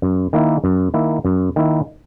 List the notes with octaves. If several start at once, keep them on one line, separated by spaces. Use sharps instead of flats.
F#2
D#3 A#3 E4
F#2
D#3 A#3 E4
F#2
D#3 A#3 E4